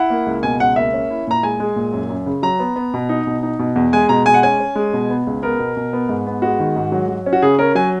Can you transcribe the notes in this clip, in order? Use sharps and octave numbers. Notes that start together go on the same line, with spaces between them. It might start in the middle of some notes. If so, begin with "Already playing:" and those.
Already playing: E4 F#5
A#3
C#2
B2 G#5
C#2 F#5
A#3 E5
C#4
E4
A#2 A#5
G#3 G#5
G#3
A#2
F#2
F#2
C#3
F#3 A#5
B3
B3
B2
D#4
B2
D#4
B2
E2
G#3 G#5
B2 A#5
G#3 G#5
F#5
C#4 G#5
C#4
G#3
B2
B3
C#2
B3 A#4
B2
B2
B3
G#2
B3
G#3 F#4
D#3
G#2
F#3
F#3
C#4
F#4
C#3 G#4
C#4 A#4
F#3 G#5